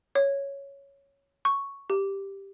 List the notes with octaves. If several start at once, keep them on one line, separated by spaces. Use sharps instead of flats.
C#5
C#6
G4